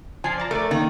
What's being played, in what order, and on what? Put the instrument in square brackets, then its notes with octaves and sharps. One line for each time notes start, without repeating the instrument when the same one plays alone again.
[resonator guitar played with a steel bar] F3 [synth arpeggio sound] G#5 A5 C7
[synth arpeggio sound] D5 A5 A#5
[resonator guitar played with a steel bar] A3 [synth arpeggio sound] A#4 D5
[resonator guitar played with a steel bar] D#3 [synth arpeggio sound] A#3